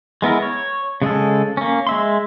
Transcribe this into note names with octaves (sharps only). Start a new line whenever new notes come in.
G#3 B3 E4 A#4
C#5
C#3 G#3 G#4 A4
A#3 C#4
G#3 E5 C6